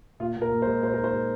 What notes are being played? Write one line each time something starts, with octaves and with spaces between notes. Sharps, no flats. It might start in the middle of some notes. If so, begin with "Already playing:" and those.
A#2 F4
A#2
A#4
A#2
C5
G#3
A#2 C5
D#4 A#4
C5
G#3